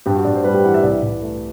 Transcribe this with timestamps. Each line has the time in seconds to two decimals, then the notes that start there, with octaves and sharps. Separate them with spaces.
0.06 G2 G4
0.16 F#4
0.24 G2 D5
0.35 C5
0.44 G3 B4
0.54 G4
0.64 E3 F#5
0.74 E5
0.83 C2 D5
1.02 C2
1.22 A3